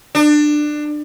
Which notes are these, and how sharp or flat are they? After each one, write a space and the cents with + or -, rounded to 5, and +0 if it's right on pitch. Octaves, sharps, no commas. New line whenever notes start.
D4 +20